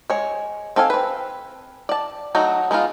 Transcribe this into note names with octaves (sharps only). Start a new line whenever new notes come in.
G#3 C#5
C4 A4 F5 G#5
C4 B4
D5 A5
F#3 A3 D#4 F#4
G#3 B3 D#4 F4